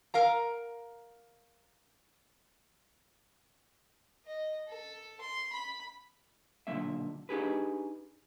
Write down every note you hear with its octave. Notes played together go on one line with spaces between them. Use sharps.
A#4 F5 A#5
D#5
A4
C6
B5
B1 A#2 D3 F3 A#3 E5
D4 D#4 G4 G#4 B4